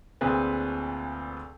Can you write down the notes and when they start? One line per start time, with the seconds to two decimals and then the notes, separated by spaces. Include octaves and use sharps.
0.21 D2 A#2 C4 G#4 B4 G#5